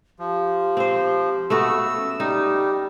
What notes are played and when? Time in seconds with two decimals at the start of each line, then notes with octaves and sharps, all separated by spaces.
0.19 F3 G4
0.77 C4 C5
1.50 A3 B3 F#4 E6
1.97 C#4
2.20 G3 D#4 G4